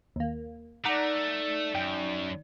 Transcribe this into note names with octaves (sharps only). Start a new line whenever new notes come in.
D#2 A#3
A3 D#4 D5 F#5 A#5 D6
F#2 G5